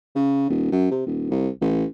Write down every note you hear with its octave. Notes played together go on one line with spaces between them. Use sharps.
C#3
D#1
F#2
C3
D#1
C2
A1